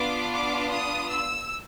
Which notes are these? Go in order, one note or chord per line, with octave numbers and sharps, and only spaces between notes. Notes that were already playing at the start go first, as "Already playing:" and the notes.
Already playing: B3 D4 F4 D6
D6
D#6
E6